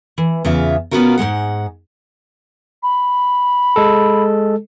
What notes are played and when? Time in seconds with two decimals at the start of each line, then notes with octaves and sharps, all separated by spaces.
0.18 E3
0.45 E2 C#3 F4 E5
0.91 B2 B3 C#4 F4 F#4 A#4
1.18 G#2 D#3 G#3 F#5
2.83 B5
3.76 G#3 A4